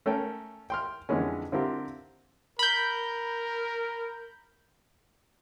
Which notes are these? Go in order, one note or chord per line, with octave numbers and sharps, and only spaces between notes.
A3 C#4 A4 A#4 G5
G5 C6 F6
F2 D3 E3 G#3 C#4
D3 C4 E4 F4 G4 A#4
A#4 B5 G6